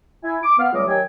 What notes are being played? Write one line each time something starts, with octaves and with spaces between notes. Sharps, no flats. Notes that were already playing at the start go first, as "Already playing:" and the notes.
E4 E5 G#5
D6
B3 F5
C#2 F#3 G3 A3 D6 D#6
D#3 F#3 G4 G5 G#5